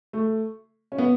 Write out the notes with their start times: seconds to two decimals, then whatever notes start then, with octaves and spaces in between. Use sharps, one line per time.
0.13 A3
0.92 C#4
0.98 B3